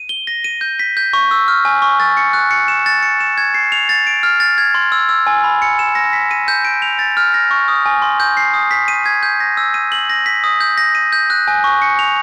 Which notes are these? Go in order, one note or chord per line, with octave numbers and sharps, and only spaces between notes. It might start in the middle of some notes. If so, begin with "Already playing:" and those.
Already playing: D#7
G7
A#6
D#7
G6
B6
G6
C#6
E6
F6
G#5
C#6
A6
C#7
F#6
C#7
E7
A6
C#7
E7
G#6
C7
F7
A6
D7
F6
A6
G#6
C6
E6
E6
G#5
B5
C#7
E7
A#6
B6
D#7
G6
D7
F7
A6
F6
A#6
C#6
D#6
G#5
C6
G6
C7
D#6
B6
D#7
G#6
G6
A#6
E6
D#7
F#7
A#6
B6
D#6
G6
A#6
D#7
G6
F#6
G#5
C#6
C#7
F7